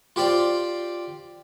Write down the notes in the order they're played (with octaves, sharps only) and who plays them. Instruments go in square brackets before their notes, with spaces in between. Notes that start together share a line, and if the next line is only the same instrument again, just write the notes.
[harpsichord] F4 G4 C5 D5